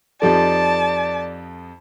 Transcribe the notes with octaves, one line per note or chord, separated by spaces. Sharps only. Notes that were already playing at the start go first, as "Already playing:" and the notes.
F2 F3 D#4 G4 A4 D5 A5